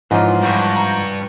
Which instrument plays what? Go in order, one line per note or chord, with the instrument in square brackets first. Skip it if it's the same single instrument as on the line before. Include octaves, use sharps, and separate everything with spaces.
[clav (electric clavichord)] G#2 F3 [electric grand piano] E3 C#4 D#4 [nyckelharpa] F4
[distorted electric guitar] G2 [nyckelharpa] G5 C#6
[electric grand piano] A#5